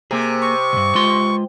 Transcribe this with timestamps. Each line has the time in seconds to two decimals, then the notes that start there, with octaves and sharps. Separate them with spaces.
0.11 C3 A#3 G#4
0.41 C#6
0.73 C2 G2
0.95 G#3 F4 C6